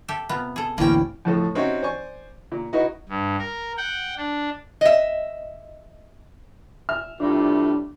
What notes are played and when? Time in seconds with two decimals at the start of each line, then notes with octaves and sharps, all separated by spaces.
0.08 G4 A4 E5
0.29 C3 B3 F4
0.56 G#4 A4
0.78 A1 D2 A#3 C4 C#4 E4 F4 G5
1.25 F2 A2 A4
1.55 C4 C#4 D#4 F#4 G4 E5
1.82 C5 D5 G#5 C#6
2.52 A#2
2.73 D#4 E4 F#4 B4 D#5
3.09 G2
3.39 A#4
3.78 F#5 G5
4.17 D4
4.81 D#5 E5
6.89 E5 F6
7.20 A2 C3 G3 A3 D4 F4